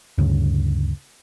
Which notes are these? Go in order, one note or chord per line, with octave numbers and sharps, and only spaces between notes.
D2 G2 C#3